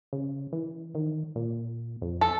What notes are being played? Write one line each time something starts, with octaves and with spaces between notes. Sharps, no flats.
C#3
E3
D#3
A#2
F2
A4